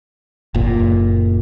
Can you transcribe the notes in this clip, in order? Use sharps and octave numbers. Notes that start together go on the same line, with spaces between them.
F#1 A#2